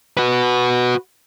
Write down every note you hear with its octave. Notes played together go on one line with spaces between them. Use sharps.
F#4 B4